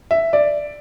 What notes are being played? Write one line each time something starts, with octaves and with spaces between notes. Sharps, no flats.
E5
D5